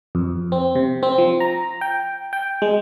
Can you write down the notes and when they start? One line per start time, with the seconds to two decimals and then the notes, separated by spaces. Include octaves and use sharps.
0.15 F2
0.52 C4
0.75 C3
1.03 C4
1.18 F3
1.40 A#5
1.81 G5
2.33 G5
2.62 G#3